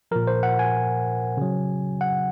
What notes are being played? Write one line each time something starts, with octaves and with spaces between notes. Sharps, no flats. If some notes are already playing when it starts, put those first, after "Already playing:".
A#2 F3 A#4
C5
F#5
G#5
C#3 F#3
F#5